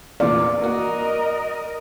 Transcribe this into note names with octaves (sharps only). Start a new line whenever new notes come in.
A1 E2 A#2 D5
A#3 F#4 A#4 D#5